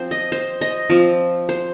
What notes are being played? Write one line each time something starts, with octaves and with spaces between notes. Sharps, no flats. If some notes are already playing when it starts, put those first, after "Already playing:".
Already playing: F3 C4 C5
D#5
C5
D#5
F3 C4
C5